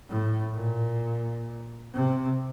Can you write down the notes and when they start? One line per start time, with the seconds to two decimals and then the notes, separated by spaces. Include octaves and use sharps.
0.09 A2
0.55 A#2
1.94 C3